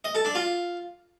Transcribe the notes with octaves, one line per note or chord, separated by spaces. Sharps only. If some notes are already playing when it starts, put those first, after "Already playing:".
D#5
A4
D4
F4